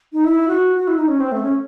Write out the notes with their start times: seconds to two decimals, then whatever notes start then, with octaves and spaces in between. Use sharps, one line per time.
0.13 D#4
0.24 E4
0.48 F#4
0.76 F#4
0.87 E4
0.97 D#4
1.08 C#4
1.20 C4
1.32 A3
1.43 C#4